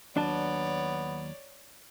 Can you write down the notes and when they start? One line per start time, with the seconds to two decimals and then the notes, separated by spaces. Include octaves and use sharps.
0.16 D#2 F#3 B3 D4 C#5 D5 A5